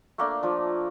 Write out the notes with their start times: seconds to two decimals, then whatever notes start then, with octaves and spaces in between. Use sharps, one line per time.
0.18 A3 A#3 D4
0.43 F3 D4